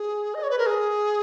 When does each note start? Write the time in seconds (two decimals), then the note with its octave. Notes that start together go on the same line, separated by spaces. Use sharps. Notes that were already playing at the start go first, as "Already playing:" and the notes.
Already playing: G#4
0.35 D#5
0.43 C#5
0.50 B4
0.59 A#4
0.66 G#4